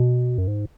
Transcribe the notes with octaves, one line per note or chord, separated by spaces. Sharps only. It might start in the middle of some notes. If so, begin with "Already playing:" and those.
Already playing: B2
F#2
G#2